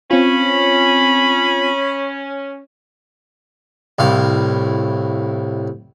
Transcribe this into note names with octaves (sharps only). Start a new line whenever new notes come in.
C4 C#4 F4 B5
C2 A2 F5